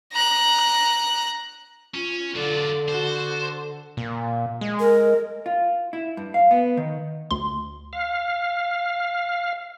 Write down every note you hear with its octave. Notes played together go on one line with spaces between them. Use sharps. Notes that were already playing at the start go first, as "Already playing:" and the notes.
A#5 F#6
C#4 F4
D3 F#3 F4 A4 D5
F#4 C5 A5
A4
A#2
G#3
A#4
F4
E4
G2
F5
B3
D#3
D2 C6
F5